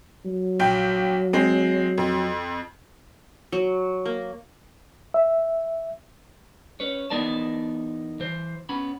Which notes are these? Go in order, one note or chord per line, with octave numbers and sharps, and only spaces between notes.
F#3
A#1 G5
G#3 C4
F2
F#3
A#3
E5
C#4 B4 C#5
E2 B3 D#4 A#4 D5 A5
E3 C5
B3 C#4 B5